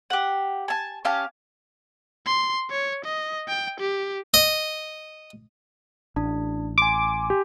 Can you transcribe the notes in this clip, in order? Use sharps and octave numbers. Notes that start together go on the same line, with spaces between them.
G4 F#5
G#5 A5
C#4 G4 F5 A5
C6
C#5
D#5
G5
G4
D#5
A1 D4
G#5 C6 D6
G4